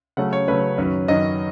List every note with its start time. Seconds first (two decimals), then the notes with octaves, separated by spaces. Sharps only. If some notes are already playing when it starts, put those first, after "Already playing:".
0.17 C#3 F#3 A3 C#4 F#5
0.33 C#5
0.48 C#3 F#3 A3 C#4 B4
0.78 F#2 D#3 F#3 C#4
1.08 F#2 D#3 F#3 C#4 D#5